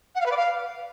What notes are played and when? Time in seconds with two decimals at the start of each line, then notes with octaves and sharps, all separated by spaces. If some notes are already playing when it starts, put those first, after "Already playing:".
0.15 F#5
0.20 F5
0.26 B4
0.31 D5
0.37 F5